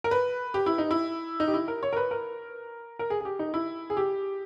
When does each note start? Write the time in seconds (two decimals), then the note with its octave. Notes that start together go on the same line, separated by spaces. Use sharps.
0.04 A#4
0.11 B4
0.54 G4
0.66 E4
0.78 D#4
0.91 E4
1.40 D#4
1.48 G4
1.54 E4
1.68 A#4
1.83 C#5
1.93 A#4
1.97 B4
2.11 A#4
2.99 A#4
3.10 G#4
3.21 G#4
3.25 G4
3.39 D#4
3.54 E4
3.90 G#4
3.97 G4